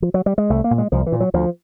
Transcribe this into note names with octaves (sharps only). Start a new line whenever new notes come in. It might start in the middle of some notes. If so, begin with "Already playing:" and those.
F3
F#3
G3
G#3
C2 A3
A#3
A#2
G#3
C2 F3
E3
A#2
F#3
D2 F3